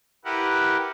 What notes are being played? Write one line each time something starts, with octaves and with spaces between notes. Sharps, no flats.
E4 G4 A#4 B4 F#5